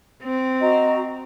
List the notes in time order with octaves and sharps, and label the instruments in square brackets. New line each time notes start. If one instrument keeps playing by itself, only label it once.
[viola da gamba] C4
[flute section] F#4 D#5 A#5